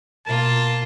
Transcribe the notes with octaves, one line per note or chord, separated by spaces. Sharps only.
B2 A#3 F4 A5